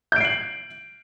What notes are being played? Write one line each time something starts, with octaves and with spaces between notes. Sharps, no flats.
G6 C7 D7 F#7